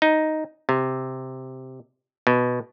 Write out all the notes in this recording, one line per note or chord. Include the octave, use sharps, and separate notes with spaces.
D#4
C3
B2